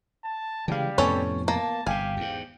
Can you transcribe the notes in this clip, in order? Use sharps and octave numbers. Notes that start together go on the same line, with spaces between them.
A5
C#3 E3 G3 G#3 G4 F5
F2 A2 C3 B3 C#4 A4 C#5
A#3 A5
G1 C3 G4 F5 G#5
E2 G#2